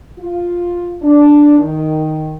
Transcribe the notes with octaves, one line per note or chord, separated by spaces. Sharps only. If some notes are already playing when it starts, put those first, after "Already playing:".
F4
D4
D#3